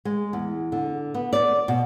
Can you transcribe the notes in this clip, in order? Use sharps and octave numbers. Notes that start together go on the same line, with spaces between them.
G#3
E2
D3
B3
D5
B2